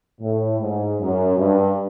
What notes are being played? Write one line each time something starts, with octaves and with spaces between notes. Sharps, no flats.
A2
G#2
F#2
G2